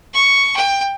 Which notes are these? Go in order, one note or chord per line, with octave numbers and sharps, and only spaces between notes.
C#6
G5